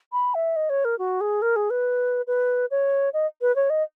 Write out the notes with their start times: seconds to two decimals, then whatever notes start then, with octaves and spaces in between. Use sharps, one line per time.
0.12 B5
0.35 E5
0.56 D#5
0.70 C#5
0.85 A#4
0.99 F#4
1.21 G#4
1.42 A#4
1.56 G#4
1.70 B4
2.27 B4
2.71 C#5
3.13 D#5
3.41 B4
3.56 C#5
3.70 D#5